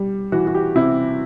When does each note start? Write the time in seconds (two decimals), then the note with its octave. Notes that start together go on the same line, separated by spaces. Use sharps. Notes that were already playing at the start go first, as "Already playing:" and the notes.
Already playing: G3
0.32 E3 F#4
0.47 F#4
0.54 G4
0.75 C3 E4